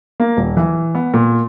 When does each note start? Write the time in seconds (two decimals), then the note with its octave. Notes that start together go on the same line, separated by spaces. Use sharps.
0.20 A#3
0.37 D#1
0.57 E3
0.95 B3
1.14 A#2